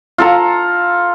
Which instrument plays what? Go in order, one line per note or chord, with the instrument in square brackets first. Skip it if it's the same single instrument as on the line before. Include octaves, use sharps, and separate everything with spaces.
[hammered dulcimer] F4 A4 A#5